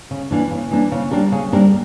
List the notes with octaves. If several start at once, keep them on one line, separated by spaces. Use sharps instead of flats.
C#3
E3 A#3 D4
C#3
E3 A#3 D4
C#3
G3 A#3 D4 A#4
C#3
G3 A#3 D4 A#4